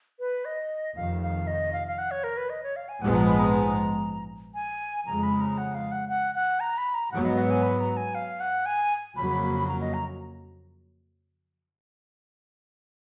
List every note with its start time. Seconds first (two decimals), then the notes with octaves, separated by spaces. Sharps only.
0.20 B4
0.45 D#5
0.96 F1 F2 D#3 F5
1.22 F5
1.47 D#5
1.73 F5
1.88 F5
1.98 F#5
2.11 C#5
2.24 A#4
2.37 B4
2.50 D#5
2.63 C#5
2.76 F5
2.89 G#5
3.01 A#1 G#2 F3 G#3 B3 F#5
3.14 A#5
3.27 B5
3.39 A#5
4.55 G#5
5.06 F2 C#3 G#3 A#5
5.23 B5
5.41 A#5
5.58 F#5
5.74 F5
5.92 F#5
6.09 F#5
6.35 F#5
6.60 A#5
6.78 B5
6.94 A#5
7.11 G#2 F#3 B3 F#5
7.25 D#5
7.38 F#5
7.50 G#5
7.62 B5
7.80 A#5
7.97 G#5
8.15 F5
8.40 F#5
8.66 G#5
9.16 F2 C#3 F#3 A#3 B5
9.29 B5
9.43 B5
9.55 B5
9.68 A#5
9.81 D#5
9.94 A#5